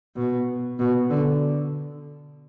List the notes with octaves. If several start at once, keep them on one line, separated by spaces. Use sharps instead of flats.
B2
B2
D3